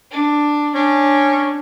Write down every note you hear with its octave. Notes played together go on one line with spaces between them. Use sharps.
D4
C#4 D4